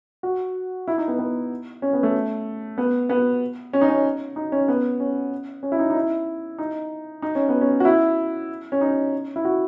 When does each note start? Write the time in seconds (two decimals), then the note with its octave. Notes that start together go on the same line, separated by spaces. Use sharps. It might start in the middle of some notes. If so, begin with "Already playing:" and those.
0.23 F#4
0.88 E4
0.98 D#4
1.08 B3
1.18 B3
1.82 C#4
1.93 B3
2.03 A3
2.78 B3
3.09 B3
3.73 C#4
3.81 D#4
3.89 C#4
4.36 D#4
4.52 C#4
4.68 B3
5.00 C#4
5.63 C#4
5.72 E4
5.79 D#4
5.90 D#4
5.96 E4
6.58 D#4
7.22 D#4
7.35 C#4
7.49 B3
7.61 C#4
7.80 F#4
7.85 E4
8.72 C#4
8.81 D#4
9.36 E4
9.45 F#4